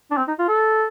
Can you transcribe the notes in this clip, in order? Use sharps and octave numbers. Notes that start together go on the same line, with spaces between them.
D4
C4
D#4
F4
A4